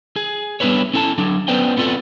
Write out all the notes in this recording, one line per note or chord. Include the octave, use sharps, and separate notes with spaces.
G#4
G3 B3 D4 E4 B4 C#5
C#4 E4 A4 F#5 A5
D3 F#3 D4
B3 C#4 B4 C5 D5 G5
B3 C4 F4 A4 D5